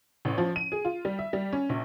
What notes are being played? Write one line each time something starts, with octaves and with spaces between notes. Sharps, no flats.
A1
F3
D#7
G#4
F4
G3
E5
G3
C#4
A#1